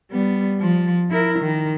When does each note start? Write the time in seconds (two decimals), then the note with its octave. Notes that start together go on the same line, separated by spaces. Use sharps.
0.11 G3 B3
0.60 F3
1.10 E4 A#4
1.39 D#3